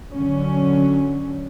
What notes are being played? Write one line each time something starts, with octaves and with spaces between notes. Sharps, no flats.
D3 F#3 C#4